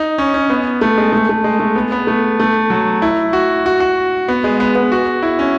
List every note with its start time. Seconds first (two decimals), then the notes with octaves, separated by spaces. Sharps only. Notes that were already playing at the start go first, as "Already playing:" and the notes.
Already playing: D#4
0.18 C#4
0.34 C#4
0.50 B3
0.81 A3
0.98 G#3
1.13 A3
1.29 A3
1.44 G#3
1.60 A3
1.76 B3
1.92 B3
2.07 A3
2.40 A3
2.70 F#3
3.02 E4
3.33 F#4
3.66 F#4
3.80 F#4
4.28 B3
4.44 G#3
4.60 B3
4.75 B3
4.92 F#4
5.23 E4
5.39 C#4